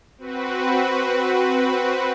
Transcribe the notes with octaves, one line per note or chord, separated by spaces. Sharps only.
C4 F#4 B4